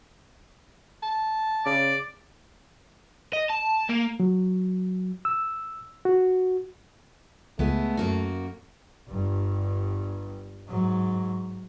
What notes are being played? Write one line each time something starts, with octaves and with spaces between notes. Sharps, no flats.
A5
C#3 D5
D#5
A5
A#3
F#3
E6
F#4
C#2 G#3 A3 B3
F#2 A#3 F#4
G1 G2
G#2 F#3